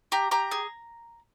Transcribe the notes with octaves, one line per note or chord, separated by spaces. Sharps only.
G4 A#5
G4 A#5
G#4